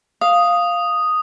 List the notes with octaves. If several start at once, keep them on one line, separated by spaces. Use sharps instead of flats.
F5 D#6